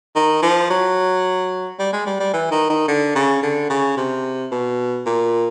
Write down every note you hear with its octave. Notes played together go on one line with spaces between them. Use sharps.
D#3
F3
F#3
G3
G#3
G3
G3
E3
D#3
D#3
D3
C#3
D3
C#3
C3
B2
A#2